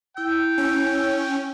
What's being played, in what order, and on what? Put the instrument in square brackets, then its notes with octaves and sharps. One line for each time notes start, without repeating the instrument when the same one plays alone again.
[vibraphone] E4 E6 [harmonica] G5
[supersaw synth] C#4